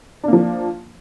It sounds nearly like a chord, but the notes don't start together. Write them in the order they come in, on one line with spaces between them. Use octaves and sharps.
D4 A#3 F3